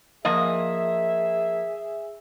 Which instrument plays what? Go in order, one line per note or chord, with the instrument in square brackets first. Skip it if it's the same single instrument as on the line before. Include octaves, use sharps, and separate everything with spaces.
[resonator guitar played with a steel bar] F3 A#3 D#5 [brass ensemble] G#4 E5